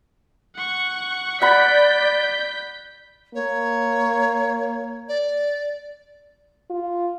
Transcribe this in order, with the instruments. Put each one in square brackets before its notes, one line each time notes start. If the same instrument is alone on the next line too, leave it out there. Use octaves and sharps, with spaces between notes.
[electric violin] F#5 C#6
[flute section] D5 [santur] F#5 B5 [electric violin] G6 B6
[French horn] A#3 [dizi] C#5
[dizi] D5
[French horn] F4